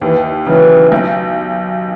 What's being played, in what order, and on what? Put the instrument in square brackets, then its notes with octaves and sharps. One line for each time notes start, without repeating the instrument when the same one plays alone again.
[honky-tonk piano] D#2 [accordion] E3
[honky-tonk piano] C#3 F#3 [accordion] E3
[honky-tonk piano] B1